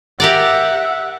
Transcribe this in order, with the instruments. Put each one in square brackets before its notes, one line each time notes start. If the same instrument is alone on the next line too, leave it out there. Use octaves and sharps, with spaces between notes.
[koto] G4 A#4 D5 [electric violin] E5 F#5